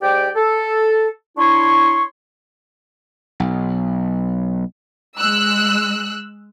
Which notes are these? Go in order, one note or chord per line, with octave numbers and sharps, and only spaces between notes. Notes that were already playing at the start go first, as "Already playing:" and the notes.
G#2 G4 D5 G5
A4
D4 E4 C#5 C6 C#6
B1
G#3 E6 F#6